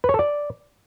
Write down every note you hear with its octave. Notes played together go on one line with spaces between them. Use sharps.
B4
C#5
A4
D5